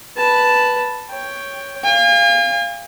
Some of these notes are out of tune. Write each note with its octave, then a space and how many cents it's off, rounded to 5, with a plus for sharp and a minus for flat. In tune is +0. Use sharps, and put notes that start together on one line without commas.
B4 +0 A5 +0
C#5 +0 G5 +5
F5 -10 G#5 -45